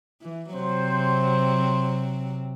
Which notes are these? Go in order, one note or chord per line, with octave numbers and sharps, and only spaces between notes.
E3
C3 F#3 C4 C5